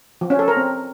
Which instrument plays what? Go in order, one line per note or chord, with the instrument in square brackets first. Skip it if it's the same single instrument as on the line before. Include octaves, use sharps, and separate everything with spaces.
[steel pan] F3
C#4
A4
A#4
C4